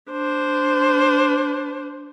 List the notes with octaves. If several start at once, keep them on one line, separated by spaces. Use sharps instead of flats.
D4 C5